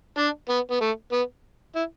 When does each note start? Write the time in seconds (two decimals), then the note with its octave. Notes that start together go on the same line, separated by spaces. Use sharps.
0.18 D4
0.49 B3
0.71 B3
0.81 A3
1.12 B3
1.75 E4